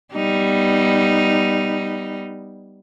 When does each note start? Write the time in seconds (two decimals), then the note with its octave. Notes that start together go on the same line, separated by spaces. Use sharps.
0.15 G3 B3 D#4